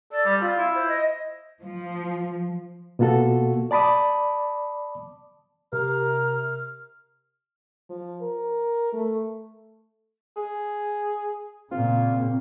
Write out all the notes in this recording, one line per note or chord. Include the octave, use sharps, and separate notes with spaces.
A4 D5
G3
C4 F4
E4
C5
D#5
F3
B2 A#3 F4 F#4 A4
D5 A5 B5 D6 D#6
C3 A#4 F6
F3
A#4
A3
G#4
A#2 C#3 C4 F4